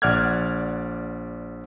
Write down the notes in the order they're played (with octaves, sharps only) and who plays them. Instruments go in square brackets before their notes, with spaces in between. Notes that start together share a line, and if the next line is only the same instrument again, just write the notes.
[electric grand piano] A#1 D5 F#5 F6 F#6 G#6